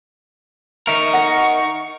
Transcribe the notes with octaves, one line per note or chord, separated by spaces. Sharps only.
D#4 A#4 E5 C#6
D#5 F#5